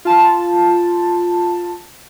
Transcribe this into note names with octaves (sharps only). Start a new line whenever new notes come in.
F4 A5